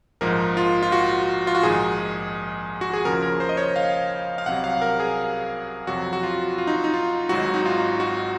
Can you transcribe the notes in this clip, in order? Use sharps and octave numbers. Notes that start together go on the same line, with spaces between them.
A#1 G#2 F3 A#4
F4
F4
F#4
F4
F#4
A#1 G#2 D#3 G#4
F#4
G#4
D#2 C#3 F3 A#4
A#4
C5
D#5
C#5
F5
F5
C2 C3 F#3 F#5
F5
A#4
G#4
F2 C3 F#3 F#4
F#4
F4
F4
D#4
D#4
F4
G#1 G#2 F#3 F#4
D#4
F4
F#4